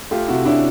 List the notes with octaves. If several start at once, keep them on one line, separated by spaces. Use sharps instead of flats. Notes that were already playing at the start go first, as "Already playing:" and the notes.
A3 F4 G4
C3 E4 F#4
C#4 D4 E4